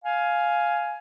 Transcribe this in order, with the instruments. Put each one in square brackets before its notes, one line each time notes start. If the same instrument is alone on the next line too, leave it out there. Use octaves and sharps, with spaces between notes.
[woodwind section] F5 G#5